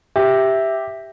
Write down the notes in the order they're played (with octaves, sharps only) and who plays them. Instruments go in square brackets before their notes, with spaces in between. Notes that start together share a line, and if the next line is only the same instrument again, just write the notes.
[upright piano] G4 [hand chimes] E5